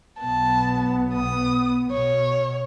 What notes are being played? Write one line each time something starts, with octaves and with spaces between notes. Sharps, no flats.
B1 B3 A5
D#6
B2 C#5